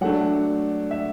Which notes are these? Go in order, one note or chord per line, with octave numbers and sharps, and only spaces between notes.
F#3 A3 D4 F#5
E5